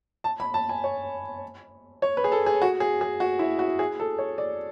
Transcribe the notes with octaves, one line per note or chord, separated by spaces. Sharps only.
A5
B5
A5
G#5
C#5
C#5
B4
G#4
A4
G#4
F#4
G#4
G#4
F#4
E4
F#4
G#4
A4
C#5
D5